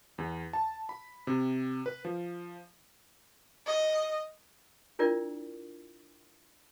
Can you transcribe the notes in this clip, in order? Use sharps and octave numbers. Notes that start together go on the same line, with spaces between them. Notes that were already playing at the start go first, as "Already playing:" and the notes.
E2
A5
B5
C3
B4
F3
D#5
D4 E4 F4 A#4 D5